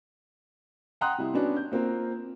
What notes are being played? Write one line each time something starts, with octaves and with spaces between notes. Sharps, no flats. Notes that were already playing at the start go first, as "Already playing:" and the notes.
F#5 G5 A#5 C6 D#6 F#6
C3 G3 E4
B3 C#4 D4 F#4
G6
A#3 C4 F4 A#4